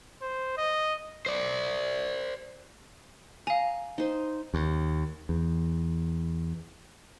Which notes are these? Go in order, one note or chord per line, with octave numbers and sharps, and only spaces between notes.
C5
D#5
C5 D5
F5 G#5 A#5
D#4 C5
D#2
E2